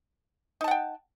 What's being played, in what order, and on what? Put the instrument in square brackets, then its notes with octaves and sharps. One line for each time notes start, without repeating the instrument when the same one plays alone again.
[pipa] D#4
A5
F#5
G5